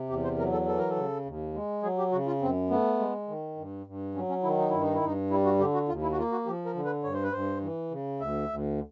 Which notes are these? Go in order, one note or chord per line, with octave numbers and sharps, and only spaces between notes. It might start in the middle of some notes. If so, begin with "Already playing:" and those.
Already playing: C3
E2 G4
C5
F#3 A#4
A4
E3 A4
A#4
A4
C#3
D#2
G#3
F#3 G#4
G4
C#3 F#4
F4
F#2 C4
A3 B3
G#3
D#3
G2
G2
F#3 C#4
C#4
D#3 E4
D#4
G2 E4
D#4
E4
G2 D#4
G3 E4
F#4
D3 G4
F#4
D#2 F4
E4
F#4
A#3 F4
F#4
F3 G4
A#4
D3
B4
G2 C#5
C5
B4
G2 C5
E3
C#3
D2 E5
D2